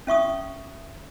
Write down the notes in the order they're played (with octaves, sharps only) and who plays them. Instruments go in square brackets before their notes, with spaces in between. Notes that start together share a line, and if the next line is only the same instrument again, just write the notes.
[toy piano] C#4 E5 C#6 D#6